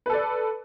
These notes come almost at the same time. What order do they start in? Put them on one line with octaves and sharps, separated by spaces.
B4 A4 D5